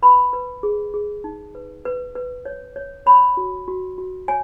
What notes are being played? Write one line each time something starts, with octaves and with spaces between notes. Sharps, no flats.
B4 B5
B4
G#4
G#4
D#4
B4
B4
B4
C#5
C#5
C#5 B5
F#4
F#4
F#4
C#5 G#5